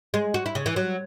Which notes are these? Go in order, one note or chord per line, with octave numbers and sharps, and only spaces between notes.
G#3
F#4
E4
C#3
E3
F#3